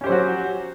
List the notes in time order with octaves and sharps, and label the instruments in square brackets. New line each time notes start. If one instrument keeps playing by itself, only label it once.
[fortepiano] C#4
G4
C5
F#3
F#4